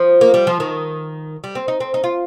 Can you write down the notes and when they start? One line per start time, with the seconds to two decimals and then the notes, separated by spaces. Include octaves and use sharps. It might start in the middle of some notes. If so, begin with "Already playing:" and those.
Already playing: F3
0.21 A#3
0.34 G3
0.47 F3
0.60 D#3
1.44 G3
1.55 C4
1.68 D#4
1.80 C4
1.94 D#4
2.04 F4